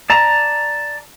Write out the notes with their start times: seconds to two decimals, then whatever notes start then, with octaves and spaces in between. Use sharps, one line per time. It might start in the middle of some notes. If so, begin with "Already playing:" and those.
0.10 D5 A5 A#5